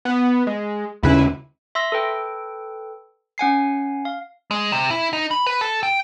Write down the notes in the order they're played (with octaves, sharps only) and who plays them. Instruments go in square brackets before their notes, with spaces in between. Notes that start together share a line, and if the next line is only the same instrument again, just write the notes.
[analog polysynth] B3
G#3
[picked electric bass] D#2 C#3 C#4 [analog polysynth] E4 B4
[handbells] E5 C6 E6 A#6
A4 B4 G5
C#4 F#5 G#5 C7
F5
[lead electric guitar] G#3
C3
E4
D#4
B5
B4
A4
G5